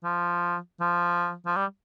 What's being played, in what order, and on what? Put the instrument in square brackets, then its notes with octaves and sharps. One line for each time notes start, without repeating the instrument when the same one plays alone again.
[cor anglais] F3
F3
F3
G3